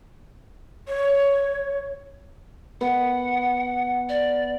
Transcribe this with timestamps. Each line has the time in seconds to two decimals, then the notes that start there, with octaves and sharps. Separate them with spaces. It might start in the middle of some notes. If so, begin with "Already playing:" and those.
0.88 C#5
2.81 B3 F#5
4.09 D5